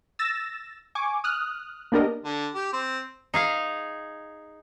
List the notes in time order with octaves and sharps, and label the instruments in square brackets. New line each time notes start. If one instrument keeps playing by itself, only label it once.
[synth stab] E6 A6 A#6 E7
G#5 C#6 D6
D#6 F6 F#6
A#3 B3 D4 G4 A#4 D#5
[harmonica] D3
G4
C4
[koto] D#4 G#4 F5